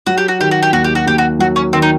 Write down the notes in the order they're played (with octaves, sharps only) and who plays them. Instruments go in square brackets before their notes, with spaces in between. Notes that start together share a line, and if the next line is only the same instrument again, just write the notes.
[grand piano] F#3 [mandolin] F#4
[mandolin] G4
F#4
[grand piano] D#3 [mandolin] G4
[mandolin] F#4
G4
[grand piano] D#2 [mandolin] F#4
[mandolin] G4
F#4
[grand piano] D#2 [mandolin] G4
[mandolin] F#4
[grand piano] F#3 [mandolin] F#4
[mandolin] C#4
[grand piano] D#3 [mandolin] C4
[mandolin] D#4